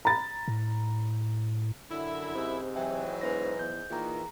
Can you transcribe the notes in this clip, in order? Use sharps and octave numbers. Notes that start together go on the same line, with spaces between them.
A#5 B5 A6
A2
F#2 D3 E4
G#2 C3
E3 F#3 E5 G5 G#5
E1 B4 C5 A#6
E2 G6
A#2 D#3 E3 G#4 A#5